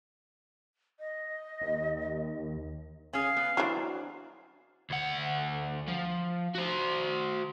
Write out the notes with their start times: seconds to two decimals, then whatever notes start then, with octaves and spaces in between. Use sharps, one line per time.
1.00 D#5
1.61 D#2
3.13 C#4 G#4 F5
3.37 B3
3.57 E3 F#3 D4 C5
4.90 D2 F#5
5.88 F3
6.55 F#4 C5